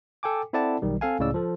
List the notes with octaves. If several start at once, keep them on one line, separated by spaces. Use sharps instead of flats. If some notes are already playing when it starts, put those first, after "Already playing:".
A4 G5 G#5 D6
C4 E4 A4 D5 F#5 A5
B1 D#3 G3
C4 A4 F5 G#5
C#2 A2 C#3 G#3 D5 E6
F3 A4